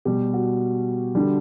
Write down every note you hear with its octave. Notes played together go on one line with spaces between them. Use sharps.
B2 G3 G4
F#4
D3 G3